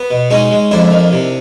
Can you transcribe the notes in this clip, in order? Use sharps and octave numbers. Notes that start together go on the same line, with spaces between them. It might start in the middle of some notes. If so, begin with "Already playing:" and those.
Already playing: B3
B2
G#3 C#4 D#4
G#3
F2 D4 E4
D#3
C3